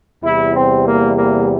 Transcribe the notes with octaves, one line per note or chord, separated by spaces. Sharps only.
E2 C3 G3 E4
C4
A#3
A#3